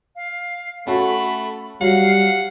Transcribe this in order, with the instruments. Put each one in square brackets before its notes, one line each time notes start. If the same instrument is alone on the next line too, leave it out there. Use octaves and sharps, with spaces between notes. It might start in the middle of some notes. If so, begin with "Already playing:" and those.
[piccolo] F5
[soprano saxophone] A3 [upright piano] C#4 F#4 A4 [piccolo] B5
[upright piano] F#3 [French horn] G3 [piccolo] F5 [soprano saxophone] F#5